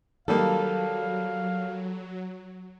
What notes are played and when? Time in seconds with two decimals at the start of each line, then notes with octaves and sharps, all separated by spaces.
0.28 D#3 F#3 G3 A#3 A4 F5